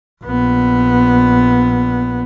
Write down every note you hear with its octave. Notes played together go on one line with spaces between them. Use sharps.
A#1 B3